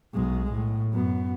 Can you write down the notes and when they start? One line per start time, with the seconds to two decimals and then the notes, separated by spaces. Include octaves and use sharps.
0.14 B1 G#3
0.52 A2
0.93 F#2 B3